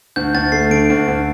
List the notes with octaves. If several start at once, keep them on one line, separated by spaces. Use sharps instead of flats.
D2 G6
D2 A6
A3 C7
D3 D7
D2
D2